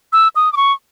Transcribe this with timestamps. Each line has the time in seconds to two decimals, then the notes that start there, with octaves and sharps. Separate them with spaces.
0.13 E6
0.36 D#6
0.53 D6
0.57 C#6